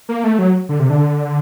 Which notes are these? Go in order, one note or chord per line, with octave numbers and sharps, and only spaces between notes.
A#3
A3
F#3
D3
C3
D3